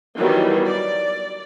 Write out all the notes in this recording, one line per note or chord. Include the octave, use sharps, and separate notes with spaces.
D#3 E3 F#3 G3 B3
D5